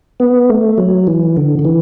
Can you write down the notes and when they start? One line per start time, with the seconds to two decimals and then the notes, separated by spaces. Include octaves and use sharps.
0.20 B3
0.49 A3
0.78 F#3
1.07 E3
1.37 D3
1.59 D3
1.65 E3